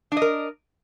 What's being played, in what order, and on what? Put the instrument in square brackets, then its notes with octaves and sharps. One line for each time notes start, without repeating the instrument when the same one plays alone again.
[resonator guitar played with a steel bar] D4
D#5
A#4